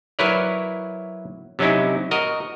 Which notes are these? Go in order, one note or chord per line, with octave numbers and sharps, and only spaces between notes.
F#3 E4 A#4 B4 C#5 D5
C3 F#3 C#4 D#4 E4
F#4 A#4 D#5